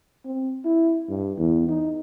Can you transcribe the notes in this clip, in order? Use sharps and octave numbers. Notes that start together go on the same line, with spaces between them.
C4
E4
G2
E2
D#4